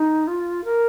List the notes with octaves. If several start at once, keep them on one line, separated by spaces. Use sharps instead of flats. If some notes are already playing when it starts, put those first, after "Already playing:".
Already playing: D#4
F4
A#4